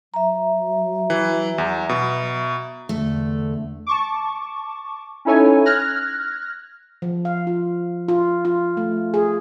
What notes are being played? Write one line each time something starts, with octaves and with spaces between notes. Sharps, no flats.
F#3 E5 A#5
E3
E2
B2
E2 D3 A3
A5 C#6 D6
C#4 D#4 E4 A4 C#5 G#5
F6 F#6 G#6 A#6
F3
F5
F4
F4
F4
A3
G#4